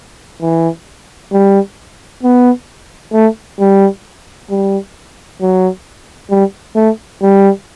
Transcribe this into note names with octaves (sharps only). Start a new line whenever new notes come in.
E3
G3
B3
A3
G3
G3
F#3
G3
A3
G3